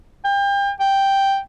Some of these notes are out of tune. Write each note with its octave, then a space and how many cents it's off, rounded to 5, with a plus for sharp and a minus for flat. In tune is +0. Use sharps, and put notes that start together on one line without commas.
G5 +35
G5 +0